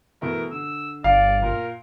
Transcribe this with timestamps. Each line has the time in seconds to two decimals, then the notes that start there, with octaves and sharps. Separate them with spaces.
0.22 B2 E3 A3 A#4
0.52 D3 E6
1.04 G1 D5 F5
1.42 A#2 A#4